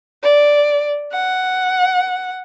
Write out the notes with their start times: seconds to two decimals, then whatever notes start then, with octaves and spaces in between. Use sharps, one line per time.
0.23 D5
1.13 F#5